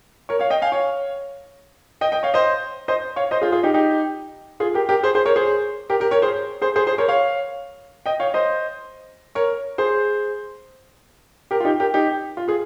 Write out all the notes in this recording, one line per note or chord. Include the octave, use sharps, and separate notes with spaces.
A#4 C#5
C#5 F5
D#5 G5
F5 G#5
C#5 F5
D#5 G5
D#5 G5
C#5 F5
C5 D#5
C5 D#5
C#5 F5
C5 D#5
F4 G#4
F4 G#4
D#4 G4
D#4 G4
F4 G#4
G4 A#4
G4 A#4
G#4 C5
G#4 C5
A#4 C#5
G#4 C5
G4 A#4
G4 A#4
A#4 C#5
G#4 C5
G#4 C5
G#4 C5
G#4 C5
A#4 C#5
C#5 F5
D#5 G5
C#5 F5
C5 D#5
A#4 C#5
G#4 C5
G4 A#4
F4
D#4 G4
G4 A#4
D#4 G4
F4
F4 G#4